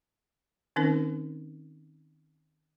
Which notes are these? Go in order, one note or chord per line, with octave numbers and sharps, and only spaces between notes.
D#3 C4 C#4 D#4 A#4